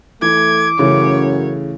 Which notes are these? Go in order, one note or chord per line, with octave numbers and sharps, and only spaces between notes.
E3 A3 D6 G#6
F#2 C#3 E3 A3 C#5